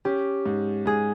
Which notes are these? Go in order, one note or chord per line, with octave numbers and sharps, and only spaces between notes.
C#4 G4
G#2
G#2 G#4